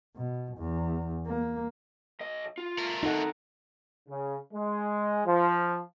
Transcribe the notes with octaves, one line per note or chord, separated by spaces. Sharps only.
B2
E2
A#3
B1 D#5
F4
A3 A#4
D#4 A4 D#5 F#5
C#3
G#3
F3